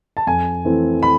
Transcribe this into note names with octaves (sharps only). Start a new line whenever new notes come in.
A5
F2 G#5
E3 A3 C4
B5